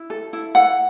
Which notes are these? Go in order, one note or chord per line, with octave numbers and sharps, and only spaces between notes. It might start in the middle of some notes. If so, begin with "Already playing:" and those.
Already playing: E4
A4
E4
A4 F#5